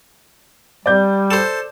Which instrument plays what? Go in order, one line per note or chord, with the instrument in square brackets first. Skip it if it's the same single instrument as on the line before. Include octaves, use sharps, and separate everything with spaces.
[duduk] G3 [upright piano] D5 G6
[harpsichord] A4 C5